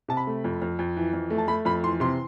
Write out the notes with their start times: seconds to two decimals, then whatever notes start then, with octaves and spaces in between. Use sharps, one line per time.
0.08 C3 A5
0.17 B5
0.27 A3
0.44 F2
0.62 F2
0.79 F2
0.97 E3
1.13 F2
1.30 A3
1.38 A5
1.48 A3 B5
1.65 F2 B5
1.84 E3 C6
2.00 C3 C6